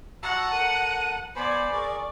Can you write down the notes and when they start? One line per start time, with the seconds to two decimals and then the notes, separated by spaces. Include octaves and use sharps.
0.23 F#4 F#5 A5 A#5 E6
0.52 A4 A#4 D#7
1.36 B3 C5 D5 G#5 B5
1.72 G#4 A#4 C#6